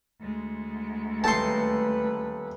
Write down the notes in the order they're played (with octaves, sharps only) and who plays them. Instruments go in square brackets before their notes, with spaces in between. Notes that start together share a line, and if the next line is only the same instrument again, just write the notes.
[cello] D2 G#3
[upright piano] D#1 A3 A4 [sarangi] B4 [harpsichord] A5 C6